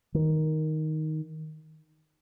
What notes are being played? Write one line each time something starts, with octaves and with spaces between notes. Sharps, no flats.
D#3